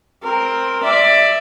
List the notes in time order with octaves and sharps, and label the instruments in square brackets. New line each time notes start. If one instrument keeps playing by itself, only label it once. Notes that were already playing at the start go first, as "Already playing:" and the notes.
[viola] C4 A#4
D5 E5